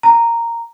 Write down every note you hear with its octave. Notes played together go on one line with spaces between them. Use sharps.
A#5